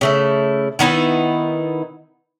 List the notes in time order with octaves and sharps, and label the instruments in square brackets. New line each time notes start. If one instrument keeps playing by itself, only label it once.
[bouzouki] C#3 A3 E4
D#3 B3 D#4 E4